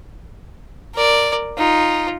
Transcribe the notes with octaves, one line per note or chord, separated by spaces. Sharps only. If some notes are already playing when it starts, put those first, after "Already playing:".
A#4 D5
D#4 F4